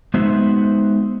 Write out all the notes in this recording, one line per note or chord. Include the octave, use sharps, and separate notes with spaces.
G#3 B3 D#4 F#4 C5 E5